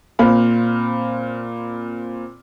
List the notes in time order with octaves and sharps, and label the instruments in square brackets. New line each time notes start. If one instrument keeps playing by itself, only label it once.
[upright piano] A#2 C4 F5 B5 F6